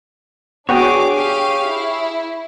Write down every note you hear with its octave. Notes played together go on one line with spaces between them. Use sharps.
B3 D4 F#4 G#4 C#5 G5 D6
G4 F5
E4